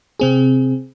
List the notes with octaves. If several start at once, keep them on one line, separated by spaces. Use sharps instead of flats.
C3 C4 G#4